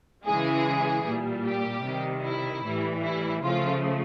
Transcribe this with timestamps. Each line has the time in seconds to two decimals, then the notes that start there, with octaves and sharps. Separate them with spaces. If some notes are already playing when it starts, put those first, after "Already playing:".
0.25 C#3 E3 G#3 G#4
1.04 A#2 G3
1.44 G4
1.84 C3 D#3 G3
2.23 E4
2.63 A2 E3 G3
3.03 E4
3.42 C#3 F3 A3 F4